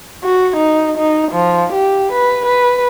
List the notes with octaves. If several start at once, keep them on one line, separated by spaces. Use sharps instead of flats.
F#4
D#4
D#4
F3
G4
B4
B4